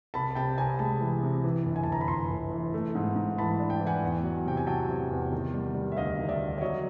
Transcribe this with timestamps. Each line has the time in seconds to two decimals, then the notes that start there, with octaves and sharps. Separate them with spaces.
0.14 C2 A5 B5
0.35 C3 G5 A5
0.58 C2 G#5 A#5
0.79 G#3 A5 B5
1.00 E3
1.23 C3
1.44 E3
1.66 G1
1.76 G#5
1.84 A5
1.87 G1
1.92 A#5
2.01 B5
2.08 G1 A#5 C6
2.30 G1
2.52 E3
2.74 A3
2.95 G#2
3.16 G#2
3.38 E3 A5 B5
3.60 D4
3.70 G5 A5
3.81 E3
3.87 F#5 G#5
4.03 E2
4.24 F#3
4.46 C3 G5
4.57 G#5
4.67 F#3 G5 A5
4.90 C3
5.11 E2
5.33 D#3
5.54 G3
5.75 G3
5.92 E5
5.97 D2 D#5 F5
6.19 D#3
6.29 D5 E5
6.40 D2
6.58 D5
6.61 F#3 C#5 D#5